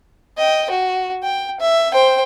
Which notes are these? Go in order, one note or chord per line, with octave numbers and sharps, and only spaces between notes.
D#5 G5
F#4
G5
E5
C5 G5